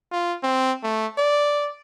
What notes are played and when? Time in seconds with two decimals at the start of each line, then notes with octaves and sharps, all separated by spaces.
0.12 F4
0.43 C4
0.84 A3
1.18 D5